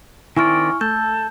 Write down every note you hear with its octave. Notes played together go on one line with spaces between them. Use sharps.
D#3 C4 E4 D5 G#5 C#6 F6
A3 A4 G6